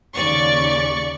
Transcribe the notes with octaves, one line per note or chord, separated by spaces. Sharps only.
D#2 C#3 D5 C#6